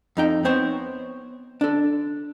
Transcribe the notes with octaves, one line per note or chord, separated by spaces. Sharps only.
F2 D#4 G5
B3 C4 C5 C#5
D4 A4